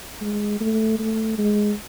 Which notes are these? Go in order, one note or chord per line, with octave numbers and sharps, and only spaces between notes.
G#3
A3
A3
G#3